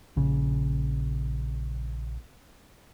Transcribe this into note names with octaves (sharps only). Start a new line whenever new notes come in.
A#1 C#3